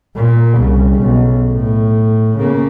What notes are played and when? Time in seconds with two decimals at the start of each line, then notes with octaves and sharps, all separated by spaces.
0.16 A#2
0.56 C2 C#3
0.99 B1
1.53 A2
2.38 C#3 A#3